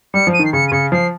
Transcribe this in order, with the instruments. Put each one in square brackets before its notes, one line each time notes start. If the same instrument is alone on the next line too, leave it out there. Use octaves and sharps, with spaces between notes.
[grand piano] G3 [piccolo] C#7
[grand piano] F3
[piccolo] D#7
[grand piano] D#3
[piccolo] C7
[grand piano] C#3 [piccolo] C#7
[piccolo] D#7
[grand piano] C#3 [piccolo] C#7
[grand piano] F3 [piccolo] C7